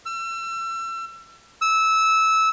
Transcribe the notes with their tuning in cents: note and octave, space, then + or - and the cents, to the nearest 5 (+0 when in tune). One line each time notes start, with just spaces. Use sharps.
E6 +35
E6 -15